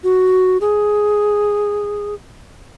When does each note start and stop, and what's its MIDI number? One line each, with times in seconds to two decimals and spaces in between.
0.04 0.57 66
0.61 2.14 68